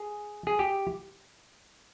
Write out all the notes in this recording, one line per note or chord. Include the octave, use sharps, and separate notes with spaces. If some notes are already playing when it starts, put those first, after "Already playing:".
Already playing: G#4
G#4
G4